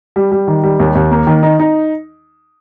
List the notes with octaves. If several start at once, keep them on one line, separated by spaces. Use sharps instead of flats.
G3
G3
D#3
G3
D#2
D#2
A#3
D#3
D#4
D#4